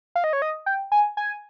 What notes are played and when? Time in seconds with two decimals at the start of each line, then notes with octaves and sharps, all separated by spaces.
0.15 F5
0.24 D#5
0.33 C#5
0.42 D#5
0.66 G5
0.92 G#5
1.17 G#5